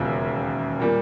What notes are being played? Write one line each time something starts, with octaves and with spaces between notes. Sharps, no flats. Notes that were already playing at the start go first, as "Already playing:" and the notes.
Already playing: E1 D#2 C#3 F3 E5
A#2 G3 A#3